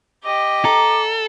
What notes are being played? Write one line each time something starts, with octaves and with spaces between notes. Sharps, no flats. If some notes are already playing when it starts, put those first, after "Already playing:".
G4 D#5 D6
A4 A#5